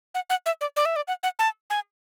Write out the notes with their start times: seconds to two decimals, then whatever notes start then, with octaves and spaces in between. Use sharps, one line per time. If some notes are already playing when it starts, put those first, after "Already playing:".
0.15 F#5
0.30 F#5
0.46 E5
0.61 D5
0.76 D5
0.85 E5
0.96 D5
1.08 F#5
1.23 F#5
1.39 A5
1.70 G#5